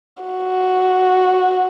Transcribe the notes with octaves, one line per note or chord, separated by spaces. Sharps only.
F#4